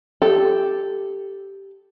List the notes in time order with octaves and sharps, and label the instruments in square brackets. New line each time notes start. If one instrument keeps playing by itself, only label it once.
[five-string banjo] G4 A4